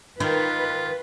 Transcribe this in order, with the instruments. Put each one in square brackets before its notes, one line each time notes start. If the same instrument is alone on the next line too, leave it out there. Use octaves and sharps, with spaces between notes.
[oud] D#3 [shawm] F4 [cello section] B4